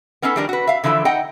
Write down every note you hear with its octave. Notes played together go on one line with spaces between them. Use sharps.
B3 C#4 D#4 G#4 A4
D#3 F3 G3 D4 G#4 A#4
F#4 B4
E5 F5
D3 E3 F3 E4 A4
D#4 D#5 F#5 G5